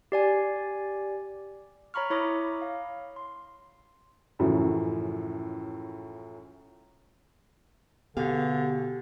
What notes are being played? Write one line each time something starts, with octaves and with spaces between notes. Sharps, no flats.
G4 D5 G#5
C#5 A#5 B5 C#6 F6
E4 C#5 B5 D6 D#6 A#6
F5
C6
F#2 A2 C#3 E3 F3
B2 D3 B3 G4 G#4 F5